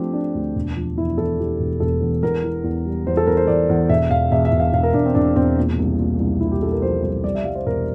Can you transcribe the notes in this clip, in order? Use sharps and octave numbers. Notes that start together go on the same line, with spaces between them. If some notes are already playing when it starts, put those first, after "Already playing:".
Already playing: F3 A3 C4 D4 G4
A3 D4
D2
E1
F3
E2 E4
E2 A4
E2 G4
E1
E1 A4
E2
E2 A#4
E3
E2
G3
E2 C5
A4
E2 A#4
C5
E2 D5
E2
E1 E5
E1 F5
E1 E5
E5
E1
F5
E1 F5
A#4
E1 D4
C4
E1 D4
E1 C4
A#2
C2
A#2
C2
A#2 E4
G4
A#2 A4
A#4
F3 C5
C2 C5
G3 D5
E5
G3 F5
C5
E1 A#4